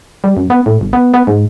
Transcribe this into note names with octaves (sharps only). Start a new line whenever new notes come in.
G3
F#2
B3
A2
G1
B3
B3
G#2